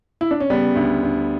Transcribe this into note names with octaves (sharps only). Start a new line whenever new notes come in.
E4
D4
C#4
C#3 G3 B3
D2
D2